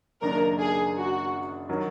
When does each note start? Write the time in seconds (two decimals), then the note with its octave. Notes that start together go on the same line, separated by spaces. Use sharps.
0.22 F#1 F#2 D#3 A#3 D4 A#4
0.59 G#4
0.96 F#4
1.69 D#3 F#3